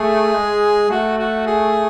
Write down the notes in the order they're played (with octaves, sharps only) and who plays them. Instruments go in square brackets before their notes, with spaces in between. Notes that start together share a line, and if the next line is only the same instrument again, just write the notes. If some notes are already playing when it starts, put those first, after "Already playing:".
Already playing: [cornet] A3 [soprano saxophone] G#4
[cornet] G#3
[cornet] A3 [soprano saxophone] F#4
[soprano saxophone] F#4
G#4